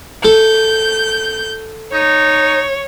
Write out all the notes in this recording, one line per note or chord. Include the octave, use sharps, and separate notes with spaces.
A4 G6
D#4 C#5